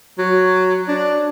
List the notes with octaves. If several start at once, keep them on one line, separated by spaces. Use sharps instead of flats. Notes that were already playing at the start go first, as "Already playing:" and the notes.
F#3
D4